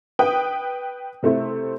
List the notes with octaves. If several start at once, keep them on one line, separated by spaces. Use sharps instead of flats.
B4 G5 D#6
C3 A3 C4 E4